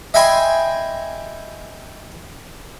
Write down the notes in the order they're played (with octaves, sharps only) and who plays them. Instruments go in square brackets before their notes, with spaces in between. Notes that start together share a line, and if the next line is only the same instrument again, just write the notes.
[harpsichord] D#5 E5 G5 G#5 B5 C6